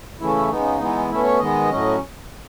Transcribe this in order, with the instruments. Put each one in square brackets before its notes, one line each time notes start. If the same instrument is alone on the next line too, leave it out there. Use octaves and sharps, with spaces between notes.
[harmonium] C#3 E3 A3 C#4 E4
C#3 G#3 B3 D#4
E3 G#3 B3
B2 A3 C#4 E4
C#5
D#3 G#3 B3 D#5
A2 F#3 C#4